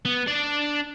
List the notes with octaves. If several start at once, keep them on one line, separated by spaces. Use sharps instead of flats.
B3
D4 D5